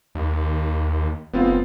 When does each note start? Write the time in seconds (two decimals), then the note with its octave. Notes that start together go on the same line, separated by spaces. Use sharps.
0.15 D#2
1.33 F1 B3 C4 F4